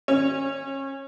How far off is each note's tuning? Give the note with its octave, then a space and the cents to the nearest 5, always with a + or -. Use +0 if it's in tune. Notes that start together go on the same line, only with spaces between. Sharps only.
C#4 -25